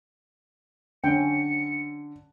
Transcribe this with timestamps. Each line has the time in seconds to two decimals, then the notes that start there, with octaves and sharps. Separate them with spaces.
1.04 D3 C#4 G5 C#7